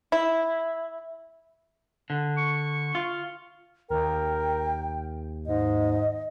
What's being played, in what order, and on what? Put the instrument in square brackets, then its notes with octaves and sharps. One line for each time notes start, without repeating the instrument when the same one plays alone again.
[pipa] E4
[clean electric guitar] D3
[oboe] C#6
[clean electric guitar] F4
[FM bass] D#2 [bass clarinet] A#4 [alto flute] G5
[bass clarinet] G#2 [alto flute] D#5